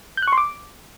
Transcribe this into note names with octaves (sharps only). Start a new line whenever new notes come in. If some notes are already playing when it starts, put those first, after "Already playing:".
G6
F#6
C#6
C6
D6